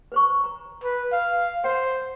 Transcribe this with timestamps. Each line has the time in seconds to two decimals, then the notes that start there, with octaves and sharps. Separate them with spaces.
0.12 B4 C5 C#6
0.44 A#5
0.84 B4
1.12 F5
1.64 C5 F#5